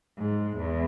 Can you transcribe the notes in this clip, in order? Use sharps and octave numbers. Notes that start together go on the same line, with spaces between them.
G#2
E2